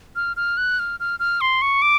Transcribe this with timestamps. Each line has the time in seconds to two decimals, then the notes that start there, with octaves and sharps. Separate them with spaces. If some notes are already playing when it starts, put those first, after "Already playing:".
0.16 F6
0.37 F6
0.57 F#6
0.79 F6
1.00 F6
1.20 F6
1.41 C6
1.62 C#6
1.82 D6